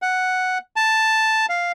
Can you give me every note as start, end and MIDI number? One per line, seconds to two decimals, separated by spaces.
0.02 0.58 78
0.76 1.46 81
1.49 1.72 77